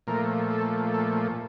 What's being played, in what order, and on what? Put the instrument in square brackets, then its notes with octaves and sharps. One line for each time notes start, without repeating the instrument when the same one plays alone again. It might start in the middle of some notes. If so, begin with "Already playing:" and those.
[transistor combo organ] A#2 F3 A3 A#4
A4
A4